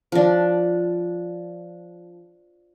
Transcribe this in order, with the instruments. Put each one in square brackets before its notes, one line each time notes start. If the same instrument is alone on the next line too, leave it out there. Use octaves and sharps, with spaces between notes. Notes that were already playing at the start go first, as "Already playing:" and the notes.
[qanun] F3 D4